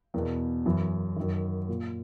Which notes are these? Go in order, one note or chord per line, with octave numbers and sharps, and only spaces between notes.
E2 B2 A#4
F#2 E3
F#2 D#3
A#2